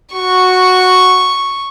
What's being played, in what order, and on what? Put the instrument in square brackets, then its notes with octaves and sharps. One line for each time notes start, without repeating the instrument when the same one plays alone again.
[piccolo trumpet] F#4 [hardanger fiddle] C#6